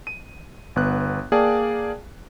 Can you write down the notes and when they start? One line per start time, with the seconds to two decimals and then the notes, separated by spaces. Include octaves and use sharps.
0.07 D#7
0.76 G1 B3 F#6
1.32 A#3 G#4 D5 F5 G5 A5